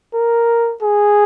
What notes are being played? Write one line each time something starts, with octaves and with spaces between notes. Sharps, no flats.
A#4
G#4